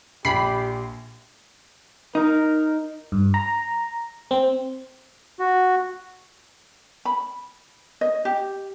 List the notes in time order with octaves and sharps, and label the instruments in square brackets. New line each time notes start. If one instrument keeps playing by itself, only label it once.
[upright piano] A#1 [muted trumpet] G4 [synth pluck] B5 C7
[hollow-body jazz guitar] D#4 [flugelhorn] A#4
[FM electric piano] G2
A#5
C4
[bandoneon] F#4
[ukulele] B5
D#5
G4